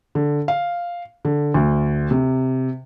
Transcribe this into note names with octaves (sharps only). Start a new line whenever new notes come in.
D3
F5
D3
D2
C3